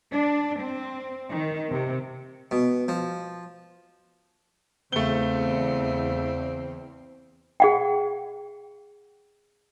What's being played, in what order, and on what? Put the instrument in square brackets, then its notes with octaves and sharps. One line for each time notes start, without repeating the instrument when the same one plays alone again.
[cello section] D4
C4
D#3
C3
[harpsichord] B2
F3
[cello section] E2 [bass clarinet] C#3 [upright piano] A3 G7 [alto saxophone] C4
[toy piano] G#4 F#5 G5